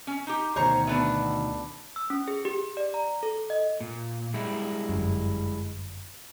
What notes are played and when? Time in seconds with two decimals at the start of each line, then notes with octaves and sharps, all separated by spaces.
0.07 C#4
0.27 D#4 G4
0.56 D2 B2 D#3 C5 C#5 A#5
0.87 A3 B3 D4
1.96 E6
2.10 C#4
2.28 G#4
2.45 G4
2.77 D5
2.94 A#5
3.23 A4
3.50 D#5
3.81 A#2
4.34 G3 G#3 E4
4.89 G1 F#2